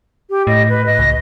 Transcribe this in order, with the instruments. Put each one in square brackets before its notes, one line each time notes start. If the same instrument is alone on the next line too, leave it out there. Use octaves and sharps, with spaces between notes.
[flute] G4
[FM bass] A2 [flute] D#5
[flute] B4
D#5
[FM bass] C#2